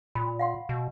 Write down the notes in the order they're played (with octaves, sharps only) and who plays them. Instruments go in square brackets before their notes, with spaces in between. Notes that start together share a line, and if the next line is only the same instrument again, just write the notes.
[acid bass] A#2 [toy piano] B5
[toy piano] F5 F#5 C6
[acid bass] B2